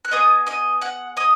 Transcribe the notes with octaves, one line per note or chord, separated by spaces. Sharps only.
F#6
B3 G#4 D#5 D#6
D#5 D#6
F#5 F#6
D#5 D#6